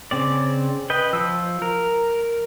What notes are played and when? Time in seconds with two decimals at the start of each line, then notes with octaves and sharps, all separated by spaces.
0.11 C#3 C4 D5
0.90 B4 D#5 G5
1.13 F3 E6
1.62 A#4